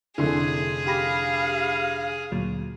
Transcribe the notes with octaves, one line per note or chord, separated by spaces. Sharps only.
F1 D3 E4 G#4 C6
G4 F5 B5 A#6
D2 A#2 F#3